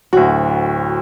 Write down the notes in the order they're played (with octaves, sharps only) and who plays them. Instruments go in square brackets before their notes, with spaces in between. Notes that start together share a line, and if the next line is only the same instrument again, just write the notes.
[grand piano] D1 D2 [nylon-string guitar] F#4